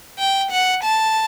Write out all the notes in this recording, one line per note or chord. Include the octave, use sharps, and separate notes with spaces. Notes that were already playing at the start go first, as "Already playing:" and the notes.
G5
F#5
A5